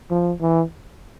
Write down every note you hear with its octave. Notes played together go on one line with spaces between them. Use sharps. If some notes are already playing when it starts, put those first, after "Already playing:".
F3
E3